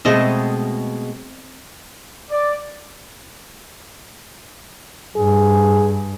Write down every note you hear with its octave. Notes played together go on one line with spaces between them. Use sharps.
B2 G#3 A3 C4 A4 D#5
D5
G2 G#4